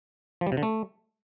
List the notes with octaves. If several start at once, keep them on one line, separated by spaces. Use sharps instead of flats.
F3
G3
C3
D3
A3